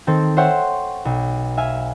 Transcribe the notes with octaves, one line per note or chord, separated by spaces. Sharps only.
D#3 C4 A4 C5
C5 C#5 E5 F#5 G5 C6
B1
E5 F5 G#5